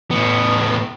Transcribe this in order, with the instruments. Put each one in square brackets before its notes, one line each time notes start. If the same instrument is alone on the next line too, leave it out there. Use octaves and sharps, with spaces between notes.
[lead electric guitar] A2 B3